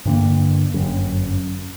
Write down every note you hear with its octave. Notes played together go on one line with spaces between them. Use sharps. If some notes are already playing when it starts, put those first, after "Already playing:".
G2 D3 A#3
G1 F#2